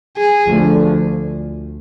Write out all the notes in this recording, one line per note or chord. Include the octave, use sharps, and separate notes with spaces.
G#4
D2 D3 F3 A3